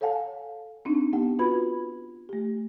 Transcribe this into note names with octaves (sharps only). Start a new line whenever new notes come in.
A4 C#5 F5 F#5 G#5 A5
C4 D4 D#4
B3 G4 F#5 G5
F4 F#4 B4 B5 G#6
A3 G4